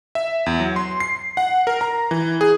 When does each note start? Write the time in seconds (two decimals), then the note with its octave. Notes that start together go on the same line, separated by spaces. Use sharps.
0.15 E5
0.46 E2
0.60 F#3
0.76 C6
1.00 C7
1.37 F#5
1.67 A#4
1.81 A#5
2.11 E3
2.41 G#4